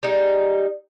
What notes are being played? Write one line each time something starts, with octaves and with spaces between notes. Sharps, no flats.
G3 G#3 D#4